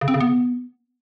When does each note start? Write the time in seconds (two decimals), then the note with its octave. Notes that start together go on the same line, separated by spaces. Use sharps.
0.01 C#3
0.08 C4
0.14 C#3
0.20 B3